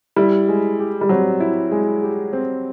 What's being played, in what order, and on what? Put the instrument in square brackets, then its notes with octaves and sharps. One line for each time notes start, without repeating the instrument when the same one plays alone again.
[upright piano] G3 [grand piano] E4
[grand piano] G#3
G4
[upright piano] G3
[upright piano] F#3 [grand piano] C4
[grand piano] E4
G#3
G4
C4